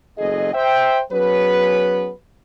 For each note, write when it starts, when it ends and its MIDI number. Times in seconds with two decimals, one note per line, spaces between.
0.17 0.51 30
0.17 0.51 40
0.17 0.51 68
0.17 0.51 69
0.17 0.51 75
0.53 1.00 72
0.53 1.00 76
0.53 1.00 79
1.12 2.10 54
1.12 2.10 59
1.12 2.10 61
1.12 2.10 68
1.12 2.10 71